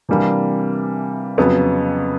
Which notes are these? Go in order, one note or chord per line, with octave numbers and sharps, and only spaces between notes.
C3 E3 G3 A#3 D4
F2 C#3 F#3 B3